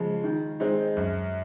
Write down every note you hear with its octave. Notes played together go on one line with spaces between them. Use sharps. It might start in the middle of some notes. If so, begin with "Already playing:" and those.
Already playing: C#3 F3 G#3
D#3
G#3 C4 D#4
F#2